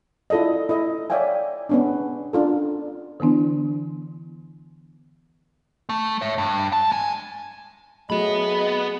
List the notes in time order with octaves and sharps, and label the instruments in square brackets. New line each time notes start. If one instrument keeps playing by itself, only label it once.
[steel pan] E4 F4 A4 D5 D#5
E4 A4 D#5
C#5 D5 E5 F5 G5 G#5
B3 C#4 D4
D4 F4 A4
[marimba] D3 E3 B3 D4 E4
[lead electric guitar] A3
C#5 E5
G2
A5
G#3 G#5
[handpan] F#3 A3 F#4 [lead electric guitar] B3 B5 [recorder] G#4 [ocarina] D#5